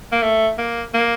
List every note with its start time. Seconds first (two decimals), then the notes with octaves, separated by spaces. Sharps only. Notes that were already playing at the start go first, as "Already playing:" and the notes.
0.12 A#3
0.23 A3
0.58 A#3
0.94 A#3